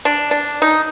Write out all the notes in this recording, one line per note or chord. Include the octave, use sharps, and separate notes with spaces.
D4
D4
D#4